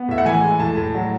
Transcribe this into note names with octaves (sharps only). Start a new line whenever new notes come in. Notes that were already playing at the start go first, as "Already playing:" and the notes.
Already playing: B3
A2 E5
F#5
E3 G#5
G#3
A2 A5
A2
F#3